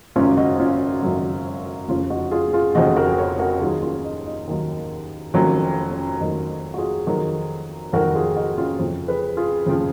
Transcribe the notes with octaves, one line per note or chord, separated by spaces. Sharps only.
G#1 F#2 C#3 F#3 C#4 F4
D#4 F#4
C#4 F4
G#1 F#2 C#3 F#3
F1 F2 C#3 F3 C#4 F4
D#4 F#4
F4 G#4
F4 G#4
F1 F2 C#3 F3 D#4 F#4
F#4 A#4
A#4 C#5
F#4 A#4
D#2 D#3 F#3 F4 G#4
C#4 F4
D#4
D#4
D#2 D#3 F#3
F1 F2 D#3 F#3 C#4 F4
C#4
F1 F2 D#3 F#3 D#4
F#4
F4 G#4
F2 D#3 F#3
F2 D#3 F#3 F#4 A#4
F4 G#4
D#4 F#4
C#4 F4
F2 C#3 F3
G#4 B4
F4 G#4
F2 C#3 F3